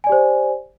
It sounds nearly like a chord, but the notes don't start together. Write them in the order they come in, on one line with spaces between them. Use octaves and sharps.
G#5 D5 G4 C5